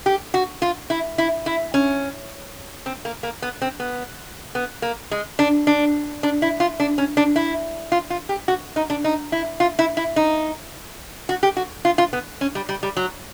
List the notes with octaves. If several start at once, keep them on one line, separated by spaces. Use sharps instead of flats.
G4
F#4
F4
E4
E4
E4
C#4
C4
A#3
A#3
B3
C4
B3
B3
A#3
G#3
D4
D4
D4
E4
F4
D4
C#4
D4
E4
F4
F4
G4
F#4
D#4
D4
D#4
E4
F4
E4
E4
D#4
F#4
G4
F#4
F4
F4
B3
C#4
G3
G3
G3
F#3